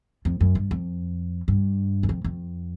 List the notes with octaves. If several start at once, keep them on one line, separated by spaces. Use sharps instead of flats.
F2
F#2
G2
F2
G2
F#2
F2
F2